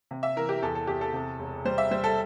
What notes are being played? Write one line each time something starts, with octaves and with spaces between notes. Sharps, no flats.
C3
E5
E3 A#4
G4
E2 A4
A4
E2 G4
A4
C3
E1
G3 C5
E5
G3 C5
A4